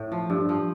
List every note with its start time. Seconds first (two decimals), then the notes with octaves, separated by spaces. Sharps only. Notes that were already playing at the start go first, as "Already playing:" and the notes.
Already playing: A2
0.12 F3
0.30 G2
0.49 F3